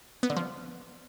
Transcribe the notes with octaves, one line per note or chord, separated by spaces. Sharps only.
B3
D3
F3